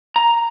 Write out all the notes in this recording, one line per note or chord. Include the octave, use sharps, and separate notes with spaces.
A#5